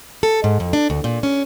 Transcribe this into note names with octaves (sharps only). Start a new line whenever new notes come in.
A4
G#2
F2
D4
D2
A#2
C#4